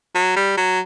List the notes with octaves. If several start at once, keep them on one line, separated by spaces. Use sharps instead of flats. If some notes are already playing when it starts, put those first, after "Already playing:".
F#3
G3
F#3